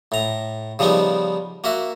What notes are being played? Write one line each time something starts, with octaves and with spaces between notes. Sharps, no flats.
A2 A#5
C#3 F3 G3 B3 D#4
A#3 F#4 E5